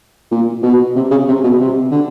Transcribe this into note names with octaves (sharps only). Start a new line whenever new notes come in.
A#2
B2
C3
C#3
C3
B2
C3
D3